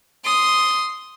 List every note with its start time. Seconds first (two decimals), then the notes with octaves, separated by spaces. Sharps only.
0.25 C6 D#6